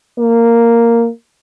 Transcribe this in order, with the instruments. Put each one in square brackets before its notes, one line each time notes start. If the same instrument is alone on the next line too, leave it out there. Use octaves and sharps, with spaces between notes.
[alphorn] A#3